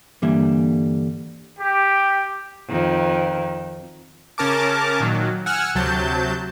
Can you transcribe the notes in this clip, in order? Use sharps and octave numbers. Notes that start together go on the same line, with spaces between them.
G2 D3 E3 G3 A#3 E5
G4
F2 D#3
C#3 C#4 A#4 A5 D6
A#2 D#3 F#3
F#5 G#5 E6 F6
D2 C3 F#3 A5 G6